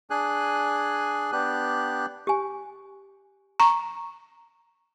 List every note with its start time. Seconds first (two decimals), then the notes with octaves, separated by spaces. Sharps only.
0.10 D4 G#4 G#5 F#6
1.32 B3 D4 G4 F#6
2.27 G4 G#5
3.60 A#5 C#6